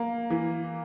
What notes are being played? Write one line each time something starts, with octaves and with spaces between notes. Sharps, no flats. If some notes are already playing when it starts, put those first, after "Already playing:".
Already playing: A#3
E3